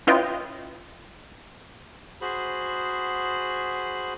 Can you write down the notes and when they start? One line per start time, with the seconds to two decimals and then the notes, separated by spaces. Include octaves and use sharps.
0.07 C#4 E4 F4 B4 D#5 G5
2.21 F#4 G#4 C5 B5